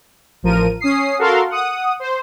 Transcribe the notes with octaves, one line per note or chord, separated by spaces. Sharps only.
A1 F3 A#4 D#7
C#4 D#6 C7
F#4 A4 A#4 F5 C6
F#5 D#6
C5